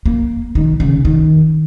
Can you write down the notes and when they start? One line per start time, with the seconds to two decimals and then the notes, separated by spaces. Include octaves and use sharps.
0.06 A#3
0.55 D#3
0.80 C#3
1.05 D#3